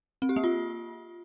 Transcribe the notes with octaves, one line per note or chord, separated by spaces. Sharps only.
C4
G4
A#3
F4